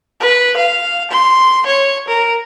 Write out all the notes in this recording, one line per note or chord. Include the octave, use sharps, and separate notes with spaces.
B4
F5
C6
C#5
A#4